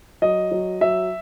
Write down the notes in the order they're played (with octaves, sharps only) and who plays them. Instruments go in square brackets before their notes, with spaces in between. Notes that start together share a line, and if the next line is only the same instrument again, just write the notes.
[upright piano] F#3 [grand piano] D#5
[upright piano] F#3
[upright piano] F#3 [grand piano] E5